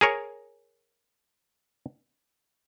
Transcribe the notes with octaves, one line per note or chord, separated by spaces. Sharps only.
G#4 A#4 C#5